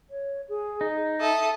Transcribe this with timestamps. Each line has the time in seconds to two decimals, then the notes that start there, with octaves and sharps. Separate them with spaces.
0.11 C#5
0.49 G#4
0.81 D#4
1.20 A4 E5 D#6